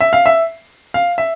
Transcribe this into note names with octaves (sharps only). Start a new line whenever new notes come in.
E5
F5
E5
F5
E5